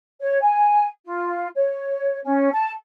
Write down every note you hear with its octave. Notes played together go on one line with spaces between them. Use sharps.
C#5
G#5
F4
C#5
C#4
A5